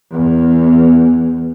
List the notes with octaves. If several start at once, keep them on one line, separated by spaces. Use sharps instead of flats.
E2